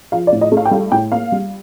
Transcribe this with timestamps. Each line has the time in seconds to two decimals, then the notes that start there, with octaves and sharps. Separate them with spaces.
0.12 F3 F5
0.27 D5
0.32 A2
0.41 D#5
0.52 A3
0.57 F5
0.66 G5
0.71 G3 F5
0.92 A2 G5
1.12 A#3 F5
1.32 G3